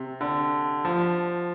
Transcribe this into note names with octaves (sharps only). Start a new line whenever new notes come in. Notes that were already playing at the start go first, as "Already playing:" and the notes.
Already playing: C3
D3
F3